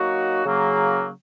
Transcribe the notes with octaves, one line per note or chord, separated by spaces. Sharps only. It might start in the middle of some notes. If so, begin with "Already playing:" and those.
Already playing: F#3 A#3 D#4 F#4
C#3 F#3 A#3